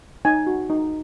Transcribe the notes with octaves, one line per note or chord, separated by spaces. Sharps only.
D#4 G#5
F#4
D#4